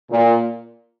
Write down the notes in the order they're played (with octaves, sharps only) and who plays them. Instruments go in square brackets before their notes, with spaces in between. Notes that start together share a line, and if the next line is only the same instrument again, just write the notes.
[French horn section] A#2